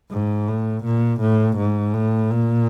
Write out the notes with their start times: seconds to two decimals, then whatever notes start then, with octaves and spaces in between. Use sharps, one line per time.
0.11 G#2
0.48 A2
0.84 A#2
1.21 A2
1.57 G#2
1.94 A2
2.31 A#2